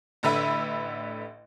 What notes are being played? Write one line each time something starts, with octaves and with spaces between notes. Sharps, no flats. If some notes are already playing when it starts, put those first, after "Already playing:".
A1 D3 B4 E5